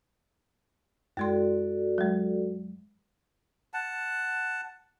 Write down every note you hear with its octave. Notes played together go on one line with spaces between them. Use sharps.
F#2 G#3 F#4 A4 D5 C6
F#3 G#3
F#5 A5